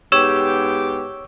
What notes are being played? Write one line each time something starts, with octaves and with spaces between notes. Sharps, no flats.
G#2 B3 G4 C#5 E6